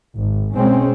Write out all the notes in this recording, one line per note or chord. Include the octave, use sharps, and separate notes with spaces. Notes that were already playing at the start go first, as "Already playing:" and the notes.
G#1
B2 G#3 C4 C#4